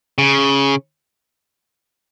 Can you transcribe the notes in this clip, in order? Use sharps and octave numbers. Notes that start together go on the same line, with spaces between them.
C#3